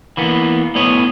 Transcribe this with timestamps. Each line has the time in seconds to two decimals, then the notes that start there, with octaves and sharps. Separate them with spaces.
0.17 E3 A#3 B3
0.75 A2 B3 C#5 D#5